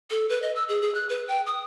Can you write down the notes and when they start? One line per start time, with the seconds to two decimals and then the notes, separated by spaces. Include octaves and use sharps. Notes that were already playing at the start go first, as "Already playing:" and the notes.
0.11 A4
0.29 B4
0.42 D#5
0.56 E6
0.69 G#4
0.82 G#4
0.95 F#6
1.09 B4
1.28 G5
1.46 D#6